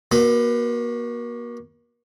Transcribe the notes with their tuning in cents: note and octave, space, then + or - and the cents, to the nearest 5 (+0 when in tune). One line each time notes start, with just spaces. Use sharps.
A#3 +35 F#4 +0 B4 +30